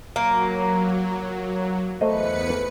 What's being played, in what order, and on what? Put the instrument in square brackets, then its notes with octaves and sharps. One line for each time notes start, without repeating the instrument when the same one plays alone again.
[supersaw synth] F#3 [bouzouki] A#3
[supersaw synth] E2 B4 C#7 [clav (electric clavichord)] A3 C5 D#5